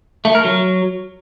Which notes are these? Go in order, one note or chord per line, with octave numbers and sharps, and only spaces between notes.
A3
A#4
F#3